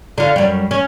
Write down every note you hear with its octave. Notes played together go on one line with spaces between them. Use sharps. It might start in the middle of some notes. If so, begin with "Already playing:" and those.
D3 F4
F#2 G3
C#4